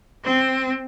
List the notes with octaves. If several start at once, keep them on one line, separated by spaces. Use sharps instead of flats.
C4